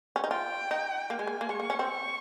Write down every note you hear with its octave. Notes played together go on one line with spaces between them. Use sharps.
C#4
D#4
F4 G5
D#4
A#3 G#5
G#3
A#3
A#3
G#3 C#6
A#3
C#4
C4
C#6